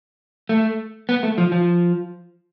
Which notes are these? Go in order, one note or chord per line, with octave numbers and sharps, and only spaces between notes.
A3
B3
A3
F3
F3